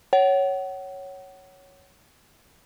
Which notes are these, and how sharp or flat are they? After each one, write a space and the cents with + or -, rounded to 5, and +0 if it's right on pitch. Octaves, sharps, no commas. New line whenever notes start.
C#5 +0 F#5 +30